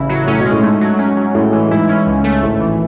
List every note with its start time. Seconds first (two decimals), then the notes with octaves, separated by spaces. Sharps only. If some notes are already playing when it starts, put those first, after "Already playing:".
Already playing: A1 C#3 E4
0.09 F#3
0.27 A2 C#4
0.39 B2
0.45 G#3
0.52 A2
0.63 G#2 A3
0.81 F#3
0.99 C#4
1.17 F#3
1.35 A2 G#3
1.52 E3
1.71 G#2 E4
1.89 C#4
2.07 C#2
2.24 A3
2.42 G#1 A2
2.60 E3